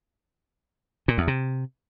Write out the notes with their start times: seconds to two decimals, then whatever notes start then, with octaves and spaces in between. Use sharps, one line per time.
1.08 A#2
1.18 E2
1.28 C3